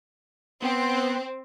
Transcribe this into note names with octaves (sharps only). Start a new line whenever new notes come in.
B3 C4